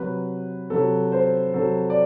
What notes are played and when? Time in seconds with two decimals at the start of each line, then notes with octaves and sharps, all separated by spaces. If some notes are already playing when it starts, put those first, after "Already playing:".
Already playing: C3 F#3 B4
0.70 C3 F#3 A4
1.12 C5
1.54 C3 F#3 A4
1.90 D5